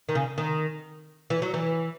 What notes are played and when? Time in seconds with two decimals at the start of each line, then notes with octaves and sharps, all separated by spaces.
0.09 D#3
0.15 C#3
0.38 D#3
1.30 E3
1.42 F#3
1.54 E3